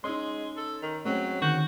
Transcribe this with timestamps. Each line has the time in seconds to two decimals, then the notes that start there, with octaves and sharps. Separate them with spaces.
0.04 G#3 C#4 D#4 C6 E6
0.57 A4
0.82 D#3
1.05 F#3 G#3 A3 C4 C#4
1.42 D3 D#3 F#4 G6